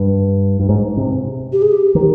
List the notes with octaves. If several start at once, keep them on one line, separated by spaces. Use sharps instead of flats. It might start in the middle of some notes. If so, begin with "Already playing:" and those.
Already playing: G2
G2
G#2
C3
G4
G#4
G4
D#3